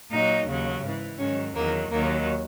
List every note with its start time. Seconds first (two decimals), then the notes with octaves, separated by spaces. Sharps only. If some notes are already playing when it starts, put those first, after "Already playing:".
0.11 A#2 F#3 D#4
0.47 D#2 C#3 F#3
0.83 G#2 E3
1.18 G#2 D#3 F#3 C#4
1.55 E2 D#3 F#3 A#3
1.90 D#2 D#3 F#3 A#3